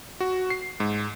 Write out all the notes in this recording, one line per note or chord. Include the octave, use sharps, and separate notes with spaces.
F#4
C7
G#2